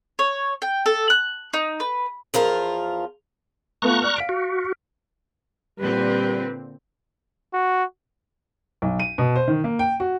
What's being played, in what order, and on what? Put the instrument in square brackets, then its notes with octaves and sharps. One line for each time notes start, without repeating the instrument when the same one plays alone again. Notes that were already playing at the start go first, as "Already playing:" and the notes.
[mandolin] C#5
G5
A4
F#6
D#4
B4
[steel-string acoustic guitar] E2 F3 F4 A#4
[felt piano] A3 B3 F4 [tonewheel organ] A#5 C#6 F#6
[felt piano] D5 F6
F5 B6 D7
[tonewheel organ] F#4
[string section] A#2 D3 C4 [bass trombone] G3 [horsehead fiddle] B4
[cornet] F#4
[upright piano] B1
D#7
B2
C5
D#3
A#3
G5
F#4